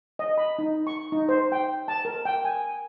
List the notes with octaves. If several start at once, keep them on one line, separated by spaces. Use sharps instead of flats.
D#5
B5
D#4
C#6
D#4
C5
G5
A5
A#4
G5
G#5